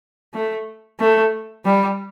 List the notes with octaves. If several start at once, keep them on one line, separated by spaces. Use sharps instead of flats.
A3
A3
G3